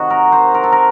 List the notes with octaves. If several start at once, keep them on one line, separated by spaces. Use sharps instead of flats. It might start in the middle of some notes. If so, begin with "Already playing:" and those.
Already playing: C3 D#3 D#4 F#4
A#4
C5
A#4
A4
A#4